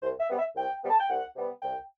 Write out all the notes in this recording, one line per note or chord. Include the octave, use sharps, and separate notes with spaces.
C2 C5
E5
C3 G3 B3
E5
C2 G5
C3 G3 B3
A5
G5
C2 F#5
C3 G3 B3
C2 G5